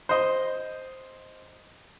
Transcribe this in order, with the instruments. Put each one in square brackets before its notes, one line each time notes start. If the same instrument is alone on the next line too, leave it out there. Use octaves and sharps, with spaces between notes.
[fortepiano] C5 D#5